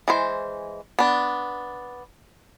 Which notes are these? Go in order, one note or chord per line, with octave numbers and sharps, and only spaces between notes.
E3 G#3 C5
B3 D4